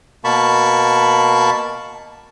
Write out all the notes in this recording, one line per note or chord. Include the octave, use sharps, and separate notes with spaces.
B2 A#3 A5 B5 C#6